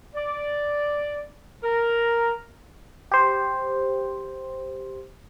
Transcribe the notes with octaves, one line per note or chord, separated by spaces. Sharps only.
D5
A#4
G4 C5